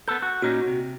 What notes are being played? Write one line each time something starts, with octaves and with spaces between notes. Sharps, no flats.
B3 A4 G6
F#4
A#2 C#4 D#4 F#4
C3